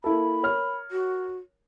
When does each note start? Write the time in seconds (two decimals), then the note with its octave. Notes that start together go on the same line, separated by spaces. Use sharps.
0.04 A#3 E4 A4 B5
0.43 A#4 C#5 F6
0.91 F#4